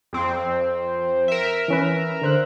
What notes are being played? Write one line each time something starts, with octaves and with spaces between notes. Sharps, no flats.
F2 C4
A#4 E5
E3 C#4 B4
D3 C5 F#6